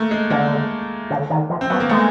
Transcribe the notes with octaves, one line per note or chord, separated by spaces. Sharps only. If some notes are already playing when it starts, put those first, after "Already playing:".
Already playing: A3 A#3
G#3
D3 A#3
D3
D#3
F3
C4
F#3 B3
A#3
G#3 A3